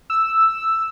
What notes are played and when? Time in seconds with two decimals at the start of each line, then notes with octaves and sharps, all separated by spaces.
0.10 E6